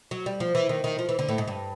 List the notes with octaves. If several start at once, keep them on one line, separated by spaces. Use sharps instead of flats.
F#3
G3
F3
E3
D#3
D#3
F3
E3
D3
A2
G#2
G2